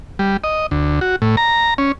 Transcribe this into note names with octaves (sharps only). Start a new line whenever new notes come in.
G3
D#5
D2
F#4
A2
A#5
C#4